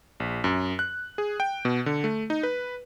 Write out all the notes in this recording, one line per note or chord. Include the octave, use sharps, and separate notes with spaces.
A#1
F#2
F#6
G#4
G5
B2
D3
A3
D#4
B4